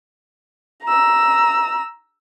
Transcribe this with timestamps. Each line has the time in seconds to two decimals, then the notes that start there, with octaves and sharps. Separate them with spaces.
0.84 A#5 E6